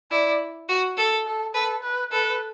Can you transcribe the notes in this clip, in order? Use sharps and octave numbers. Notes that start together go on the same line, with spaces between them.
E4 D5
F#4
A4
A4
A4 B4
B4
A4 B4